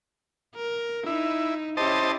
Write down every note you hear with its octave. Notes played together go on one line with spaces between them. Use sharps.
A#4
D#4 E4
C#4 E4 G4 C5 D#5 A5